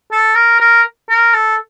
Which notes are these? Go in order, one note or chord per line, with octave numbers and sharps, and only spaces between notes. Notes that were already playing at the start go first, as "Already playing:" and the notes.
A4
A#4
A#4
A#4
A4